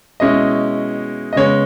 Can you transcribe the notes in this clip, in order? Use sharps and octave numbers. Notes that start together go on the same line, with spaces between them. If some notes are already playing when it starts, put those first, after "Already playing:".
B2 G#3 C#4 E4 D#5
D#5
C#3 G#3 B3 C#5